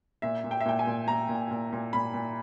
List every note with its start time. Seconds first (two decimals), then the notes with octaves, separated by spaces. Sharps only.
0.22 A#2 E5
0.44 A#2
0.51 G5
0.61 E5
0.65 A#2 G5
0.79 G#5
0.87 A#2
1.08 A#2 A#5
1.29 A#2
1.51 A#2
1.73 A#2
1.93 A#2 B5
2.14 A#2